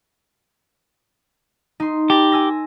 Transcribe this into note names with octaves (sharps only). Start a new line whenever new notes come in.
D#4 C6
G4 A5 A#6
G#5 E6 A#6